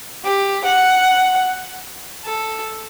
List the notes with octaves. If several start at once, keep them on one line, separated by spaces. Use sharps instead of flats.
G4
F#5
A4